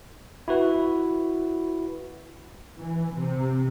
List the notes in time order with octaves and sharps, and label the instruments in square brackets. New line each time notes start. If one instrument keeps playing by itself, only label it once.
[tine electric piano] E4 F#4 B4
[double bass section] E3
C3